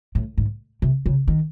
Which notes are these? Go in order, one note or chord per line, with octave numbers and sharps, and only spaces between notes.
A2
G#2
C3
C#3
D#3